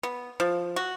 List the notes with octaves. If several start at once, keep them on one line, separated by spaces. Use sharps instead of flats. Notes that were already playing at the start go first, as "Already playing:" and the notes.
B3
F3
F#4